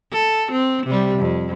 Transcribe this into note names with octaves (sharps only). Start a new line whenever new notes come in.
A4
C4
C3 G3
F2